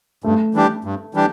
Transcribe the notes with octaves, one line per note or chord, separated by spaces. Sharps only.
G2 A3
E3 G3 D4 G4
G2
E3 G3 D4 G4